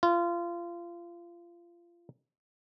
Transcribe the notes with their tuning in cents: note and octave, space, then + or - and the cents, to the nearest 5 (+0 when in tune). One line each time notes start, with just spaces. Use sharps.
F4 -25